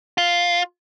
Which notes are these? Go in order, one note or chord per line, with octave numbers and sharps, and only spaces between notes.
F4